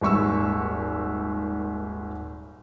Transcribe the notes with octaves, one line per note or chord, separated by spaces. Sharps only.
D#1 G#1 C#6 E6